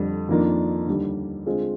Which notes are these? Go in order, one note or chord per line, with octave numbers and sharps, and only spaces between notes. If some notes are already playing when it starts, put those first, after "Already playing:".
Already playing: F2 D3 G3
F2 D#3 A#3 D4 F4
D#2 D3 G3
D3 G#3 C4 F4 G#4